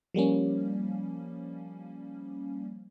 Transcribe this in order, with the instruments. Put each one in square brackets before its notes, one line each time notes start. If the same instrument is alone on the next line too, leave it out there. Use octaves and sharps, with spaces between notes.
[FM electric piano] F3 G3 A#3 C#4